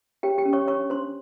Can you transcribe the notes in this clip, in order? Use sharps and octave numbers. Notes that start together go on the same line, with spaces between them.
G4 C#5 G5
G4 G5
C#4
C#5 C#6
D4 C#5 C#6
D4 C5 C6